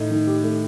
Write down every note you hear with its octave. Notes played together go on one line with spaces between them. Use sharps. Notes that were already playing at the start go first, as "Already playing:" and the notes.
Already playing: A2 D#3 A3 D#4
D#3
G4
A3